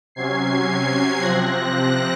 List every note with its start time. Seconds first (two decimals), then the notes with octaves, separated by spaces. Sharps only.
0.15 C3 F#3 C#4 G#6 C7
1.21 C3 F3 C4 F#6 A#6